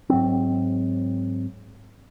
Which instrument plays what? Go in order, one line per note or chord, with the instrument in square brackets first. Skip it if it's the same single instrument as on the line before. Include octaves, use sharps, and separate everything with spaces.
[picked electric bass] G#2 F#3 C4